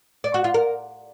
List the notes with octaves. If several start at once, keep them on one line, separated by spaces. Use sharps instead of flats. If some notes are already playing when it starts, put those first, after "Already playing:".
D5
F#4
F4
A#4